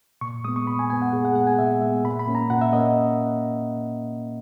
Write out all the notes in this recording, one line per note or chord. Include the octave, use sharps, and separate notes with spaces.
A#2 C#6
G#3 B3 D#6
C#6
A#2 B5
G#5
G#3 B3 G#5
F#5
A#2 G#4
F#5
G#3 B3 F#5
G#5
A#2 E5
G#3 B3 E5
A#2 B5
B5
A#3 C#4
A#5
A#2 F#5
E5
A#3 C#4 D#5